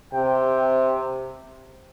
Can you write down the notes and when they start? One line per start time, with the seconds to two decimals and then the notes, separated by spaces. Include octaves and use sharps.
0.14 C3 G5